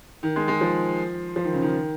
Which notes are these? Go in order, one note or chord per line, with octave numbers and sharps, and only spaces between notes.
D#3
G#3
G#3
F3
F3
D#3
C#3
D#3